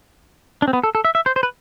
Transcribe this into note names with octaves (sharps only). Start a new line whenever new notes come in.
D4
C4
B3
A4
A4
E5
E5
C5
C5
B4